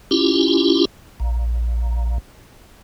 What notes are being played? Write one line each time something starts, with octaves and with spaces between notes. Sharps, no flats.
C#4 E4 F4 G4
A#1